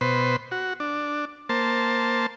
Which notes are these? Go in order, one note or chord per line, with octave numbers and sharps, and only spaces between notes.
B2 B4 C5
F#4
D4
A#3 C5 A5